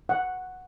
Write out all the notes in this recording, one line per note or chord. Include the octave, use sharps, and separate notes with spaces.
F#5